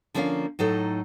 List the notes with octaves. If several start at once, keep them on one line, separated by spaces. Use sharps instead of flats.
D3 F3 A#3 C#4 D5 F5
A2 F#3 D#4 A4